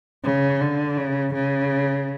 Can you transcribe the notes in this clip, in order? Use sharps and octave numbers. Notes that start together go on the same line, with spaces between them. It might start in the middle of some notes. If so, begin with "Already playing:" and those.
C#3
D3
C#3
C#3